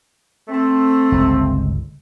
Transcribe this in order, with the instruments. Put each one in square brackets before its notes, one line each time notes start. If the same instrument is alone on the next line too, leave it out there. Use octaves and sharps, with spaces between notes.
[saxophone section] A3 C4
[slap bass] G1 C#2